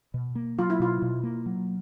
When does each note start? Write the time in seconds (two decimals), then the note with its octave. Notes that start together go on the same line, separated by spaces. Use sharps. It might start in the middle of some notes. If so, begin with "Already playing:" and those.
0.14 B2
0.35 A#3
0.58 F#3 F4
0.70 E4
0.80 B2 F4
1.02 B2
1.23 A#3
1.46 F#3